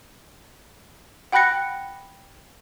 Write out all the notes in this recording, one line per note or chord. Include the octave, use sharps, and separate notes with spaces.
F#5 G5 B5 F#6 A#6 C#7